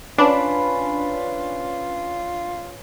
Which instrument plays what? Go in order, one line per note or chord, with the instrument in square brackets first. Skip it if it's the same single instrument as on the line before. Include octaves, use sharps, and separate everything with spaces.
[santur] C#4 B4 [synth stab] D4 [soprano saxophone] F4